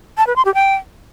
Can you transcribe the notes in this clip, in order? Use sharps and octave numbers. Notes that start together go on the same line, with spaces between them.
A5
B4
C6
G4
G5